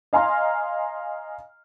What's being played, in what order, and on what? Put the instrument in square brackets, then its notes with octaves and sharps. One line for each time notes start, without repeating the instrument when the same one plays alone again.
[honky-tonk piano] D#5 F5 G#5 A#5 C6 F6